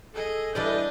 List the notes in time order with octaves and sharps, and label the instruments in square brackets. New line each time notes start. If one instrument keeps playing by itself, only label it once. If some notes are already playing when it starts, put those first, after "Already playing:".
[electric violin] G#4 D#5 [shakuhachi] A4
[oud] E3 G3 D5 [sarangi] D4 [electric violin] D#5 G6